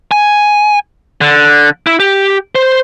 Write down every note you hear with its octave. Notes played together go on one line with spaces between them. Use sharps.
G#5
D3
E4
G4
C5